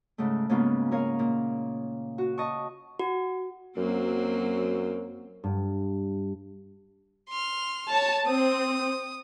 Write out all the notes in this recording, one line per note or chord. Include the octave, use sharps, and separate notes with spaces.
G#2 C#3 A3
G#2 C#3 A#3 B3 C#4 F4
F4 A#4 C#5 D#5 F5
A#2
F#4
D#5 A5 C#6
F#4
F#2 F#3 A#3 C4
G2
C6 F6
C#5 A5
C4 D#6